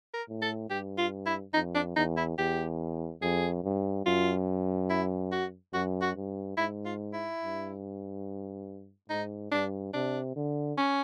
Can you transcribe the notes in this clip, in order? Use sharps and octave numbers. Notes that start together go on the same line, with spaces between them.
A#4
A2
A4
G2 G4
F4
E4
F2 D#4
D4
E2 D#4
E4
E2 G4
F2 G#4
G2
F#2 F4
E4
F#4
F#2 F#4
F#4
G2
G#2 E4
F4
E4
G2
G#2 D#4
G2 D4
C3 D4
D3
C#4